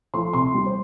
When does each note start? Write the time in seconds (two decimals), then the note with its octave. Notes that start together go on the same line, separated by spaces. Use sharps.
0.14 F3 A3 C6
0.33 C3 C6
0.54 G3
0.66 C5